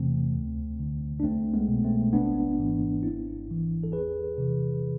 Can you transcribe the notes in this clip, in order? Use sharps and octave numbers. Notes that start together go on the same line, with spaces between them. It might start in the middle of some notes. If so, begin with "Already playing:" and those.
Already playing: E2 C3 E3 A3 C4
D2
D3
D4
C2 A3 C4
G#3 B3
B2
A3 C4
G#1 B3 D4
G#2 E3
G#1 C4 E4
G#2 E3
A4
E2 G#4 B4
C3 E3